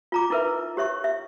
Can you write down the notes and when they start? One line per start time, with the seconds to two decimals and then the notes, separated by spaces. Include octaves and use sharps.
0.12 F4 A#5 D6
0.30 D#4 E4 A#4 B4 E5
0.77 G4 C#5 E5 C#6
1.04 E5